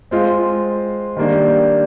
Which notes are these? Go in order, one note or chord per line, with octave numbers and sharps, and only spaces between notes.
G#3 C4 F4
D#3 G3 A#3 D4